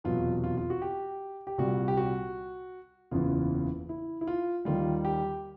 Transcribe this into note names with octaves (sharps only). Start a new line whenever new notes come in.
F1 E2 B2 F#3 F4
F4
F4
F#4
G4
G4
C2 A#2 G3 F#4
G4
F#4
F#1 E2 C#3 E3 F4
E4
E4
F4
D#2 D#3 G3 F4
G4